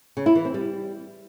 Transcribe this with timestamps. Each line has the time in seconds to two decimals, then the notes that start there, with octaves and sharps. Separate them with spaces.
0.17 C#3
0.26 E4
0.35 E3
0.45 C4
0.54 G3